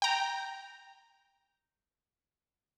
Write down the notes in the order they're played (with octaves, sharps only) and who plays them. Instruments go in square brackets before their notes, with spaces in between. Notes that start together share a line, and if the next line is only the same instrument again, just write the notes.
[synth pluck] G5 A#5